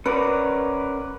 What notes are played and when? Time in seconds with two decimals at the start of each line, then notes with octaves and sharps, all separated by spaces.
0.06 C#4 A#4 B4 D5